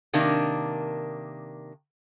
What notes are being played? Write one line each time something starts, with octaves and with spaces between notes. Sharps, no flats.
C3 D#3 A#3 D4